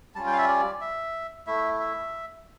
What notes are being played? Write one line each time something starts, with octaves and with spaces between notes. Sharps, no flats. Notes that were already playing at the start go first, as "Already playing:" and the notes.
G3 C#4 F4 A5
G5
F5
E5
D5
E5
A3 E4 E5
E5